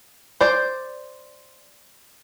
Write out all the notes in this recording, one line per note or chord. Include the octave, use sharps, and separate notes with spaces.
C5 D5